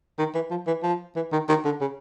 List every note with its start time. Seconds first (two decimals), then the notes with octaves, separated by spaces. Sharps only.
0.19 D#3
0.35 E3
0.51 F3
0.67 E3
0.83 F3
1.16 E3
1.33 D#3
1.49 D#3
1.65 D3
1.81 C#3